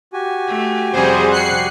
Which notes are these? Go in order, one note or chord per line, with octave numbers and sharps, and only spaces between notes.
F#4 G4 G#5
A3
F2 C3 G3 G#4 C5
F#6 C7 C#7